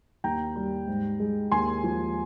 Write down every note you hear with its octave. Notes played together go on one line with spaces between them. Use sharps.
D#2 G5 A#5
G3
G#2
G#3
D#2 G#5 C6
F3